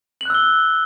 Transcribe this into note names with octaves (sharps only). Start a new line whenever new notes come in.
E6 F#6 F#7 G7